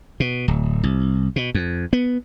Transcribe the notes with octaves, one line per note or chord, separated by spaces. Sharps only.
B2
D1
C2
B2
F2
B3